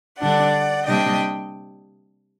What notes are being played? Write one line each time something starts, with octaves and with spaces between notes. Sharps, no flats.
D3 G3 D4 D5 F#5
C3 G3 A#3 D4 D#5 G5